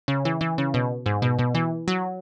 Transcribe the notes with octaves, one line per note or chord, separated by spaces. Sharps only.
C#3
E3
E3
C#3
B2
G#2
B2
B2
E3
F#3